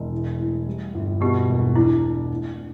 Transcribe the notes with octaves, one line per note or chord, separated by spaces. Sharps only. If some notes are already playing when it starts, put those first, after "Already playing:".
Already playing: E1
E3
A2
G3
G1
B2 G4
E1
D4 E4
D4
A2
D4